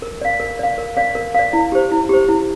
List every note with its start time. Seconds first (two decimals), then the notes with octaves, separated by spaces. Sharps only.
0.02 A#4
0.21 D5 F5
0.40 A#4
0.59 D5 F5
0.78 A#4
0.97 D5 F5
1.15 A#4
1.35 D5 F5
1.53 E4
1.72 G4 C5
1.91 E4
2.09 G4 C5
2.28 E4